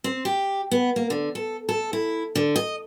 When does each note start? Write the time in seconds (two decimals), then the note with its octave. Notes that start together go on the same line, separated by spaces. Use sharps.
0.04 C4
0.25 G4
0.71 B3
0.96 A#3
1.10 D3
1.35 A4
1.69 A4
1.93 E4
2.35 D3
2.56 D#5